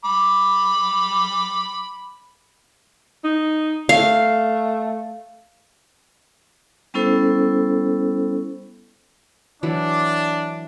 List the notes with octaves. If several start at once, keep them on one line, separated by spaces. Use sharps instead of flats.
B5 D6
D#4
A3 F5
G3 B3 C#4 E4 A4 C5
E3 F#3 D4 B5